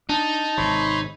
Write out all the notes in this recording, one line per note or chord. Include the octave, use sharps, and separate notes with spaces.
D4 D#4 A5
G#1 C3 C#5 B5 C6